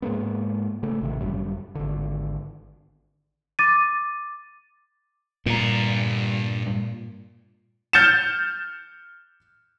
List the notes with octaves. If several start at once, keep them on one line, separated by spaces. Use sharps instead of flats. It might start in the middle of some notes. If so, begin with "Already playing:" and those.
G#2 G#3 A#3 B3
C#3 A3
A1 C3 D#3
G1 F#2 G3
G#1 D3
D6 A6 D#7
G2 A#2 A#5
F6 G6 A6 C#7 E7